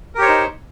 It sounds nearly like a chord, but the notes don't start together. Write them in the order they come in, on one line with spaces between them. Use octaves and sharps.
A#4 G4 C#5 C5 D#4